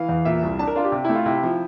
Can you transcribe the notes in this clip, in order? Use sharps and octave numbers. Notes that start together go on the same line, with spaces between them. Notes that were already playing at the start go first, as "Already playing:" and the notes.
Already playing: E3 F5
E2
A#2 E5
C2
D4 A5
A#4
D4 F4
G4
C3
A3 E4
F4
C3 E4
F3